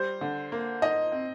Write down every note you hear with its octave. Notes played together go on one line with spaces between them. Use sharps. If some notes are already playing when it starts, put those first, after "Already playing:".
Already playing: G3 C5
D3
A#3
D#4 D#5
C4